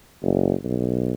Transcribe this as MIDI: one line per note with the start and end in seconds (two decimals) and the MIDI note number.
0.22 0.54 30
0.64 1.14 35